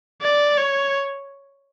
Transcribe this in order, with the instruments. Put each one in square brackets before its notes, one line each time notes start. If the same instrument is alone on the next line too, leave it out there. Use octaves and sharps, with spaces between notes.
[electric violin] D5
C#5